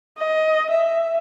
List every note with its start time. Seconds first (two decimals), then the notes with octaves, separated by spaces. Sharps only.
0.18 D#5
0.70 E5